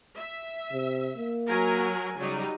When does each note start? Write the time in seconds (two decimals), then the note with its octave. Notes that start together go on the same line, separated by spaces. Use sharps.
0.18 E5
0.72 C3
1.17 A#3
1.47 F#3 A#4 G#5
2.18 C#3 F#3 G3 D#4